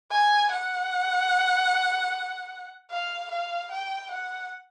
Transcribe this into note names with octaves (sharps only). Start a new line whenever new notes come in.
G#5
F#5
F5
F5
G5
F#5